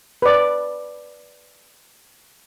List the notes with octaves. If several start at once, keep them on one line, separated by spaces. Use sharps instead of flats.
B4 D5